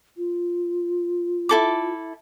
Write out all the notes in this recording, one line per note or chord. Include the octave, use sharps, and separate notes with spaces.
F4
E4 A4 D6